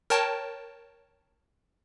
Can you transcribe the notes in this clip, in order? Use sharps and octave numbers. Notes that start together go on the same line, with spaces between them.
A#4 C#5 G5 A5